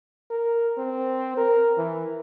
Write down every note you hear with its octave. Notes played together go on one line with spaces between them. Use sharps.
A#4
C4
A#4
E3